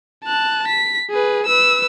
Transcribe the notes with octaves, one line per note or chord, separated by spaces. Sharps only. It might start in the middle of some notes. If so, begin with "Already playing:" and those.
A5 F#6
B6
G#4 B4
B4 E6